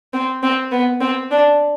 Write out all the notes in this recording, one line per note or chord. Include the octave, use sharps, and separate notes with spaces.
C4
C4
B3
C4
D4